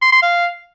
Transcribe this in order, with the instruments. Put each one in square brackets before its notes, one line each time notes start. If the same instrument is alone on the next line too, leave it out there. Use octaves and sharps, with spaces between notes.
[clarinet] C6
C6
F5